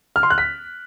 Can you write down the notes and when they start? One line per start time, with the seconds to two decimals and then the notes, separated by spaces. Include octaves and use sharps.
0.16 F6
0.23 C6
0.30 F#6
0.38 B6